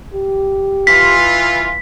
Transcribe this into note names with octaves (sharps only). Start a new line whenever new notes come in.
G4
E3 F4 B6